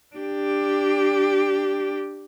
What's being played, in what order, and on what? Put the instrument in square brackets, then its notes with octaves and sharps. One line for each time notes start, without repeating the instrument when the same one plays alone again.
[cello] D4 G4